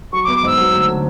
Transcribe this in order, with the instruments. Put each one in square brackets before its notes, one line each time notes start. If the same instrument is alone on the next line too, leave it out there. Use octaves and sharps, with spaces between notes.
[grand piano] F#3 [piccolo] C#6
[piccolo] D6
[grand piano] B3
[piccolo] D6
[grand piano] G#2 [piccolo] E6
[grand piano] F#3
D2
D3